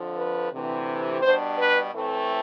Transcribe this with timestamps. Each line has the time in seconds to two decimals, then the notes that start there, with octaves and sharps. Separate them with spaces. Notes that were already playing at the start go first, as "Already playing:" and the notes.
Already playing: F2 D3 F3
0.17 B4
0.52 D2 C3 E3
1.22 B2 G3 D4 C5
1.58 B4
1.92 A2 E3 A3 C4